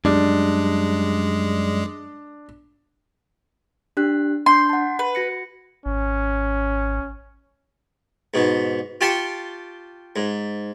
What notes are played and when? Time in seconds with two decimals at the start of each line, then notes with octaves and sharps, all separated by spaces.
0.05 F#2 G3 G#3 D4
3.97 D4 G4 F#6
4.46 D4 C6 G6
4.69 F#5 A5
4.99 B4
5.15 F#4 A#6 C#7
5.86 G#1 C#4
8.34 G#2 B2
9.01 F4 G4 G5 A5 C6 C#6
10.16 G#2